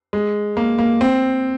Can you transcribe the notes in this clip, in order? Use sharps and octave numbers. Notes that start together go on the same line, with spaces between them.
G#3
A#3
A#3
C4